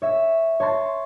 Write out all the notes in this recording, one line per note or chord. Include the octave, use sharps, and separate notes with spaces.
C#5 E5
C#5 A5 C6 A6